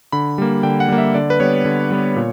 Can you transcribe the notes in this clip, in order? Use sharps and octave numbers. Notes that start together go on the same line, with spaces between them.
D3 B5
G3 A#3
D3 G5
F#5
G3 A#3
E5
D3 D5
B4
G3 B3 C#5
D3
G3 B3
A#2